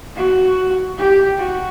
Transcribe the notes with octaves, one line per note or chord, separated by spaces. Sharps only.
F#4
G4
F#4